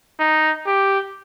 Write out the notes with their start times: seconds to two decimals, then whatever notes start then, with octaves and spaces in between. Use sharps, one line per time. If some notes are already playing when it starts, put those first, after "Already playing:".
0.19 D#4
0.66 G4